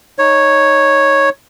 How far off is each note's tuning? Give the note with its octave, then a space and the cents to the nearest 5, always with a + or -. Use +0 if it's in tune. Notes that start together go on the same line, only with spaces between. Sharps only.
D#4 +0 C#5 -5